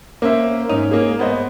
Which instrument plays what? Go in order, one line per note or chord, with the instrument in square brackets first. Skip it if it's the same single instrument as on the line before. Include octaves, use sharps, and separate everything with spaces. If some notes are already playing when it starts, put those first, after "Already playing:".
[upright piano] A#3 C5 E5 [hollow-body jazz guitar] C#4
[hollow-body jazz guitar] G#2 D#4 [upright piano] C#4
[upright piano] A#3 G#4
B3 C5 D#5